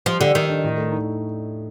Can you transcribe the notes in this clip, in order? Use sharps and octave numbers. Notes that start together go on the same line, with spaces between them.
F3 G3
D3 G4
D#3 D5
D4
A2
A3
D#4